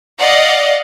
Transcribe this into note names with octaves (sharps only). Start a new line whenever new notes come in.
D5 D#5 F5 F#5